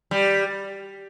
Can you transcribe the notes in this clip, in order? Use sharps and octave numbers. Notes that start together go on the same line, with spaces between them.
G3